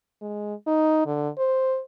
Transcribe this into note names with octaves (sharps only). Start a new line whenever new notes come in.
G#3
D#4
D3
C5